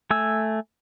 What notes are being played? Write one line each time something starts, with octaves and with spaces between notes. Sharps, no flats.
A3 G#5 E6